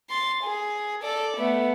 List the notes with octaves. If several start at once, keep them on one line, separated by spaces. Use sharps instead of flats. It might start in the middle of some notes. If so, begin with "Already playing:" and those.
C6 A6
G#4
A4 D5
A3 B3